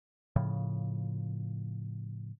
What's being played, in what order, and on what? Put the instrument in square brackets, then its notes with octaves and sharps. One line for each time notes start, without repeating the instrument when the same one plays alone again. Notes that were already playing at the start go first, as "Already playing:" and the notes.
[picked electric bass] A2 C#3 F3